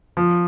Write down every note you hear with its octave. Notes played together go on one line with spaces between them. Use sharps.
F3